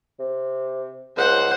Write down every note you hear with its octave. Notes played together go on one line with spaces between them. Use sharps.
C3
C#2 C5 F#5